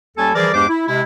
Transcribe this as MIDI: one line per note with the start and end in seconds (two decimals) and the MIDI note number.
0.17 0.30 39
0.17 0.30 55
0.17 0.30 61
0.17 0.30 69
0.17 0.30 80
0.17 0.30 81
0.35 0.51 52
0.35 0.51 53
0.35 0.51 55
0.35 0.51 68
0.35 0.51 70
0.35 0.51 74
0.54 0.65 40
0.54 0.65 43
0.54 0.65 56
0.54 0.65 67
0.54 0.65 72
0.54 0.65 86
0.69 0.84 64
0.88 1.03 48
0.88 1.03 56
0.88 1.03 64